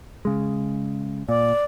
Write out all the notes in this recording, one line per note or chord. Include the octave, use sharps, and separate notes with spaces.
C#3 G#3
A#2 D5